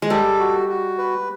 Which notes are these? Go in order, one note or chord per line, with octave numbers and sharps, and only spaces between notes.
G#3
G3 A4
F#4
F#4
B4